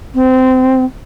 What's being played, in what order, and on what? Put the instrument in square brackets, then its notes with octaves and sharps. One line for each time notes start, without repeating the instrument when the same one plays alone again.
[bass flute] C4